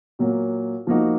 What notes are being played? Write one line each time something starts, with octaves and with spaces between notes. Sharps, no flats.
A#2 F#3 A#3
F3 A#3 D#4 F#4